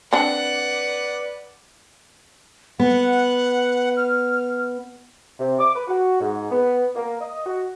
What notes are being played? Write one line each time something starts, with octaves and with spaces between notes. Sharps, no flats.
C4 D4 B4 D5 F#5
B3 F#5
F6
C3
D6
B4
F#4
G#2
B3
A#3
D#5
F#4